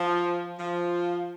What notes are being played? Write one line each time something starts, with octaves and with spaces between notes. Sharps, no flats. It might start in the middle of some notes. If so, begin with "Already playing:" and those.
Already playing: F3
F3